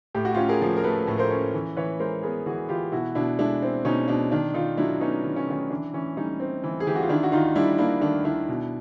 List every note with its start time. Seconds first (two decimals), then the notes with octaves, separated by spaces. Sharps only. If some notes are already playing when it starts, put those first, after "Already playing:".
0.14 A2 G4
0.25 F#4
0.34 C#4 F4 G4
0.49 G#4 A#4
0.62 F3
0.77 A#4
0.84 A3 A4 B4
1.08 A2
1.18 A#4 C5
1.31 C#4
1.54 E3
1.76 E3 B4 C#5
2.00 G#3 A#4 C5
2.23 B3 G#4 A#4
2.46 E3 F#4 G#4
2.69 E3 F4 G4
2.92 B2 E4 F#4
3.15 B2 D4 E4
3.39 G#3 D4 E4
3.62 C4
3.85 B2 C#4 D#4
4.08 B2 D4
4.31 D#3 D4
4.54 D#3 D#4 F4
4.77 F#3 D4 E4
5.00 B3 C#4 D#4
5.24 D#3
5.36 C#4
5.47 D#3 C#4
5.70 E3 D4
5.93 E3 C#4
6.17 G3 C#4 D#4
6.40 C4
6.64 E3
6.80 G#4
6.87 E3 G4
6.95 F#4
7.02 F4
7.09 D#3 D4 E4
7.23 F#4
7.32 D#3 D#4 F4
7.56 G3 D4 E4
7.78 A#3 D4 E4
8.01 D#3 D4 E4
8.25 D#3 D4 E4
8.49 B2